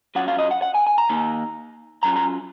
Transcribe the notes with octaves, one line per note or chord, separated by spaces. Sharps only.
F#3 C#4 F4 F#5
F5
D#5
F#5
F#5
G#5
G#5
A#5
D#3 A#3 D#4
F#3 C#4 F4 A#5
A#5